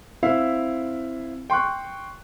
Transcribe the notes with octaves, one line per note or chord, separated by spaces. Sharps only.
C4 E4 E5 F5
G5 C6 C#6 F#6